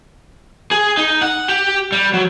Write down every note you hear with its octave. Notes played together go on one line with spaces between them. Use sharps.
G#4
D#4
F#5
G4
G3
F#3